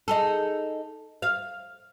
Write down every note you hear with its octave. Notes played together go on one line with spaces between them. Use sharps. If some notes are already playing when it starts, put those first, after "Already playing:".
D#4 G#4 A4
F5